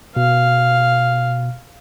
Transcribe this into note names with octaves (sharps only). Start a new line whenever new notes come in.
B2 F5